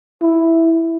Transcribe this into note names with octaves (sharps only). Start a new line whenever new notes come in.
E4